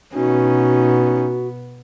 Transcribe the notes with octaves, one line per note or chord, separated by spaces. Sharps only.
B2 B3 C#4 D#4 F#4